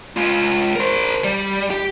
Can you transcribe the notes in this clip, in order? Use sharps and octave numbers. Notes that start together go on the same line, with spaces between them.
G#3 F4
A#4 C5
G3
G4